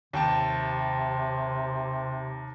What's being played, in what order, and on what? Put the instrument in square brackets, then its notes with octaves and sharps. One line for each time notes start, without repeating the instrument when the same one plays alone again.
[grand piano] D#2 G5 A5 [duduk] C3